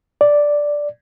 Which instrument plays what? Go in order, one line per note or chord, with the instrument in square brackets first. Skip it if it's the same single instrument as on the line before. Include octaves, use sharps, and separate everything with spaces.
[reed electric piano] D5